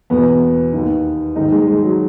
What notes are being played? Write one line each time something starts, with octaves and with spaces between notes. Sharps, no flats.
E2 B2 B3
D#2 D#3
G#2 D#3 D#4
G#3
G#3
F#3